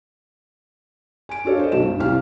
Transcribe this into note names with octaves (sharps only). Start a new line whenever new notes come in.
G#5 D7
D4 F#4 A4 C#5 F5
C5 D#5
B1 F#4 E7
G2
C2 G3 F5 F6